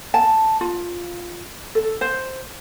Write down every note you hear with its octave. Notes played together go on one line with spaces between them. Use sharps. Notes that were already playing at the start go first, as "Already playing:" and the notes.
A5
F4
A4
C5